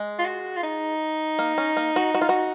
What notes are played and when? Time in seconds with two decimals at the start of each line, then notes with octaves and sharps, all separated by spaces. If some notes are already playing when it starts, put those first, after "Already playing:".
Already playing: G#3
0.19 F4
0.25 F#4
0.57 F4
0.63 D#4
1.39 A#3
1.58 C#4
1.77 A#3
1.96 F#4
2.15 F#4
2.21 F4
2.29 F#4